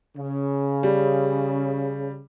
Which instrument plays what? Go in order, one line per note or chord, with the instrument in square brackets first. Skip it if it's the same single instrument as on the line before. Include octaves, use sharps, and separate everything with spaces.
[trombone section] C#3
[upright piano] G3